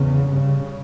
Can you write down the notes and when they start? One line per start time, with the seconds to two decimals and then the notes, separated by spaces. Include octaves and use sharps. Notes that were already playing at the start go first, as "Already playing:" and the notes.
Already playing: E2 C#3
0.31 G2 C#3